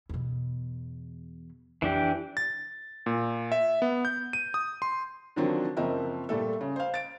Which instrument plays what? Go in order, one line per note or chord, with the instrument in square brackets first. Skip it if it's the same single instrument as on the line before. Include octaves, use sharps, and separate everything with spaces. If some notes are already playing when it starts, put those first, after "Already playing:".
[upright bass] E2 B2
[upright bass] F2 [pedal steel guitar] E3 D4 G4
[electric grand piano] A6
A#2
E5
B3
G6
D#7
D#6
C6
[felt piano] D3 D#3 F3 F#3 C4 D4
F#1 F3 C4 A#4 D#5 E5
A#2 G3 A3 A4
C#3
C5 F5
A6 D7